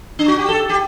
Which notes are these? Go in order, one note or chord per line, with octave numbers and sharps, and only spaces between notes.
D4
F#4
G4
A4
G4